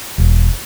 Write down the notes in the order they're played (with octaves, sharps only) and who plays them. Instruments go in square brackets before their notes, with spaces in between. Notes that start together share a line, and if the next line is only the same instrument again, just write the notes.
[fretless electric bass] E1